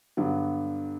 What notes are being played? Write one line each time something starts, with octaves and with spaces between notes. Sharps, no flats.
G2 D3 F#3 B3